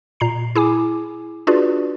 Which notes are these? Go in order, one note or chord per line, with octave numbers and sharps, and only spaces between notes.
A#2 A#5 C7
E4 G#4 G#5 D6
D4 F4 F#4 G#4 B4 D5